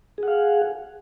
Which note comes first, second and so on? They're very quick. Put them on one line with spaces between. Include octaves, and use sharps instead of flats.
G#4 F#5 F5